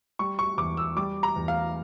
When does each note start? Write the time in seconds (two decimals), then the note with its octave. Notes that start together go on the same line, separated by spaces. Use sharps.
0.19 G3 C#6
0.39 C#6
0.58 E2 D6
0.77 E6
0.96 G3 D6
1.23 A#5
1.36 E2
1.48 F5